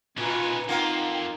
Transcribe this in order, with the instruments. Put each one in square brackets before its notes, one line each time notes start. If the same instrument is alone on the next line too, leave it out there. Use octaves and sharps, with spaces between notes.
[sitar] A#2 [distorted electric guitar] D#3 C#4 [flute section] F4 [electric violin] B4 G#5
[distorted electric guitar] F2 [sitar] A#3 F4 [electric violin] D#4 [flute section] F#5 G5